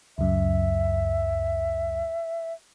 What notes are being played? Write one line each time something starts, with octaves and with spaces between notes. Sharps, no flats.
C#2 F#2 E5